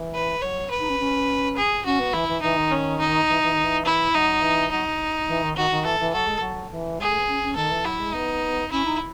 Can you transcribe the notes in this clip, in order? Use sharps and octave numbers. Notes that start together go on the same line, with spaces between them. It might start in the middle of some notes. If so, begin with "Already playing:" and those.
Already playing: E3
B4
F#3 C#5
B4
D#4
C#4
C#4
G#4
C#4 F#4
B3
E3 E4
E3
E3 D#4
D#3
C#4
D#4
E3
E3
D#3
E3
E4
F#3 D#4
E3
F#3 D#4
E3
D#3
D#3 F#4
D#3
E3 A4
E3
F#3 A4
G#3
F#3
E3
G#3 G#4
A3
B3
C#4
C#4
D#3 A4
E3
F#3 E4
G#3
B3 D#4
C#4 E4
D#4